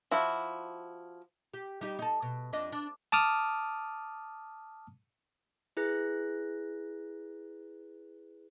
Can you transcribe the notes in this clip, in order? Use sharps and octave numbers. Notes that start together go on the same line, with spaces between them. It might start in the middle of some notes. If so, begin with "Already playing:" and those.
F3 E4 F#4
G4
G3 D#4 G4
D#4 A4
B2
F2 D4 D#5
D4
A5 D6 D#6 F6
E4 G#4 B4 F#6 A#6